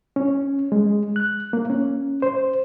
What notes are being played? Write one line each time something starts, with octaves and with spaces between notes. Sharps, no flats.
C#4
G#3
F#6
A#3
C#4
C5